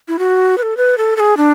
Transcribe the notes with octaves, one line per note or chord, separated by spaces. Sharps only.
E4
F#4
B4
A4
B4
A4
A4
G#4
D4